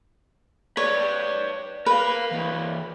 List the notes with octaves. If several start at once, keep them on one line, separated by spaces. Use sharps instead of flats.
B4 C#5 D5
A#4 B4 F5
E3 A#3